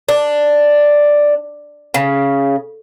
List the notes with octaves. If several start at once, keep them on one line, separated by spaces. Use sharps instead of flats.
D4
C#3